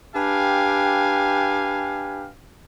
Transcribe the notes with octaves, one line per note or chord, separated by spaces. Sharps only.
D4 G4 B4 F5 G5 G#5